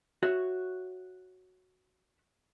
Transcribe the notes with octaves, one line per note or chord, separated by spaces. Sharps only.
F#4 C#5 E5